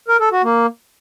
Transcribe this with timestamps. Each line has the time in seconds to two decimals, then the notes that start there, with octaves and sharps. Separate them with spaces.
0.08 A#4
0.20 A4
0.32 F#4
0.44 A#3